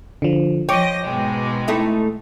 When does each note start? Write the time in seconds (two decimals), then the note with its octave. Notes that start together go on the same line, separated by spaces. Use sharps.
0.22 D3 F3
0.69 F3 C#5 D#5 G5 D6 A#6
1.04 G#2 B2 G#3
1.68 A3 D#4 E4